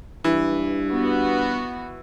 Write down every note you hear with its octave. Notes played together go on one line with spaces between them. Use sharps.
G2 E3
B3 F#4